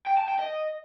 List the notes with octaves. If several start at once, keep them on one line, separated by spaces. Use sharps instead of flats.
G5
A5
G5
D#5